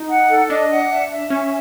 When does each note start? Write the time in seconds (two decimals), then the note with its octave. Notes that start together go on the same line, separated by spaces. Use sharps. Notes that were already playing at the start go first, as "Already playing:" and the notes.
Already playing: D#4
0.10 F#5
0.30 A4
0.50 D4 D#5
0.70 F#5
0.90 E5
1.10 E5
1.30 C#4 E5